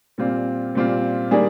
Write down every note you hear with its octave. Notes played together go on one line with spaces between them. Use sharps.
A#2 G3 C4 F4
A#2 G3 C4 F4
D#3 G3 A#3 D4 G#4